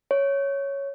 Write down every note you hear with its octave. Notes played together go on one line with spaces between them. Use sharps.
C#5